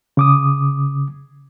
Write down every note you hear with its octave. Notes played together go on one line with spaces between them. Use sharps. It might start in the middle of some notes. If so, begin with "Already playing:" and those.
C#3 D6 D#6